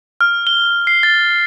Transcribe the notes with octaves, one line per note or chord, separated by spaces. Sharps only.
F6
G7
C7
A6